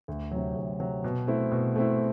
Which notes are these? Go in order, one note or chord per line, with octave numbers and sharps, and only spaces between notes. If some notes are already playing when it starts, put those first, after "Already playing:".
D2
C3 F#3
D2
C3 F#3
B2
A3 C4 E4
B2
A3 C4 E4